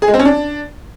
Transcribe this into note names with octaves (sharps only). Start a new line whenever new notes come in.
G#4
G#3
C4
C#4
D4